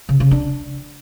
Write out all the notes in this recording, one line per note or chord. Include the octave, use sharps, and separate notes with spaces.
C#3
C#3
D4